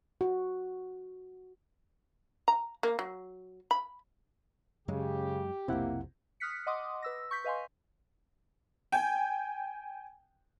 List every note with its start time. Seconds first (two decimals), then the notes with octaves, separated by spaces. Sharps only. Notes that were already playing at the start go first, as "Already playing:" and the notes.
0.21 F#4
2.48 A#5
2.83 A#3
2.99 F#3
3.71 B5
4.88 F#2 C#3 F#3 G#3 G4
5.68 B1 F2 C3 A#3 C4 E4 F#5
6.40 D#6 F6 F#6 B6 C#7
6.67 D#5 F#5 C6 D6 D#6
7.02 B4 E6 A#6
7.31 C#6 G6 B6
7.44 B4 D#5 F5 G#5 C6
8.92 G5 G#5